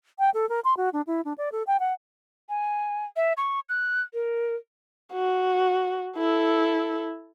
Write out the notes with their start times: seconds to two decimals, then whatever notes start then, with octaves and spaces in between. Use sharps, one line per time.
0.19 G5
0.34 A4
0.49 A#4
0.65 C6
0.77 F#4
0.93 D4
1.07 E4
1.25 D4
1.38 D5
1.52 A4
1.67 G5
1.80 F#5
2.49 G#5
3.16 E5
3.37 C#6
3.69 F#6
4.14 A#4
5.13 F#4
6.18 E4 A4